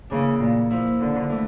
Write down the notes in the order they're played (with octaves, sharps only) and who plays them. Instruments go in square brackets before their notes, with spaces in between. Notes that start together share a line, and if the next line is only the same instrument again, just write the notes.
[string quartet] C#3 [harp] E3 A#3 D4
[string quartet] A#2
[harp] F3 A#3 E4
[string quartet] D3
[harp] E3 A3